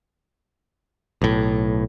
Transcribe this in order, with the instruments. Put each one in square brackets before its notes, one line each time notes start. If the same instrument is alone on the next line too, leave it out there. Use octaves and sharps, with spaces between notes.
[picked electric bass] B1 A2